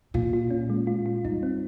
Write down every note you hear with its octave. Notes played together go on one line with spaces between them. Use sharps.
A#2 F4
F4
C#4
G#3
F4
F4
G2 D#4
C4